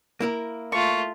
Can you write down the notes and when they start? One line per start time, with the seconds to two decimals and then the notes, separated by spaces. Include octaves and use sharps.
0.20 A#3 E4 A#4
0.72 A3 F4 C#6